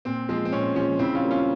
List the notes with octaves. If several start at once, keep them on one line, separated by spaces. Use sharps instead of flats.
A#2 C4
F3 G#3 C4
C4
A#2 C#4
F3 G#3 C#4
C#3 C4 E4
C#4 F4
G3 A#3
C#4 F4